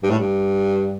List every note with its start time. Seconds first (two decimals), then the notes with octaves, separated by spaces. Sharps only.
0.03 G2
0.10 A2
0.18 G2